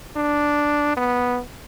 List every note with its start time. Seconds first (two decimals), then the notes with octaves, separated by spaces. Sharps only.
0.17 D4
0.97 B3